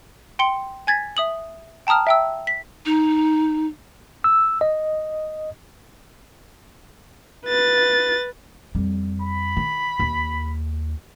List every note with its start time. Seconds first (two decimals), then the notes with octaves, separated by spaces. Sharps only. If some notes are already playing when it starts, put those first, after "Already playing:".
0.39 G5 C6 C#7 G7
0.87 G#5 G#6 A6 B6
1.17 E5 D#6 F#7
1.87 G5 A5 A#5 D#6 F6
2.07 E5 G5 E6
2.47 B6
2.86 D#4
4.24 E6
4.61 D#5
7.45 B4 A6
8.75 F2 G3
9.22 B5
9.57 D#3
9.99 D#2